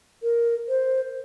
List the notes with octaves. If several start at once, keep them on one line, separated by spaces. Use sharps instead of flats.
A#4
C5